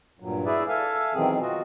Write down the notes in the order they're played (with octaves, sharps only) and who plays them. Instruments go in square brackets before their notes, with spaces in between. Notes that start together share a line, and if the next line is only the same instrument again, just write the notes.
[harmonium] G2 A#2 F#3
E4 G#4 B4 D5 E5
A4 E5 F5 G#5
B2 D#3 E3 F#3 C4 G#4
F4 F#4 D#5